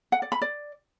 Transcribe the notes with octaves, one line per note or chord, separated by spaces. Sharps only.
F#5
D5
B5
D5